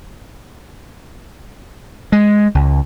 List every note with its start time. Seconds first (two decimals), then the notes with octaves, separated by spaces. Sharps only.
2.12 G#3
2.55 C#2